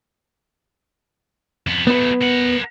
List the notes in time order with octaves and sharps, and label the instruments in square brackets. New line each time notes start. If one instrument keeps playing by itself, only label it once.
[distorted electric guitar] F2 B3
[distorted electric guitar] F#3 A3 [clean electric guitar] B3 B4
[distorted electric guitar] A#4 F#5